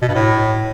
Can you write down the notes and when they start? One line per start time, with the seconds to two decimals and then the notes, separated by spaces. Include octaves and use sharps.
0.02 B2
0.08 G2
0.15 A2